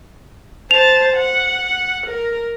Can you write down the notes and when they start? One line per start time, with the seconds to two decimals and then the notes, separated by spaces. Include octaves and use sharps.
0.71 C5 A5 F7
1.16 F#5
2.06 A#4